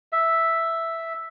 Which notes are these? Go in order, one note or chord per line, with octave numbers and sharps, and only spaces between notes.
E5